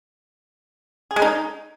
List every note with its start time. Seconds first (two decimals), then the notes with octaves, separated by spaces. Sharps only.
1.11 G#4
1.16 G#3
1.22 D#4